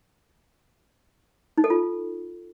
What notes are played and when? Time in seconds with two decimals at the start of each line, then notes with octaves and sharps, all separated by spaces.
1.58 D#4
1.64 A4
1.70 F4